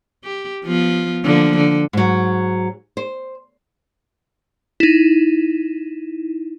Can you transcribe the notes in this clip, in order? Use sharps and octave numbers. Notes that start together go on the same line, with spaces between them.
G4
F3 B3 F4
D3 F3 A#3
D3
G#2 F#3
C5
D#4 E4